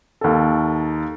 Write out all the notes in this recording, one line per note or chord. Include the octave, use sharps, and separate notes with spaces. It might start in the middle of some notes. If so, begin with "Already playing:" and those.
D#2 A4